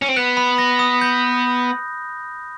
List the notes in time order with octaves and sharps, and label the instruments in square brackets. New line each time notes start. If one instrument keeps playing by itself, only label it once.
[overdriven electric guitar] C#4
C4
[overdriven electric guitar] B3 [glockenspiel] F#6
[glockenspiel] B5
A#6
D#6
G6